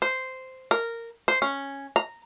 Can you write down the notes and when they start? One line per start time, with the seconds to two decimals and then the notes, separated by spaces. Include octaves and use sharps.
0.02 C5
0.71 A#4
1.28 C5
1.42 C#4
1.96 A#5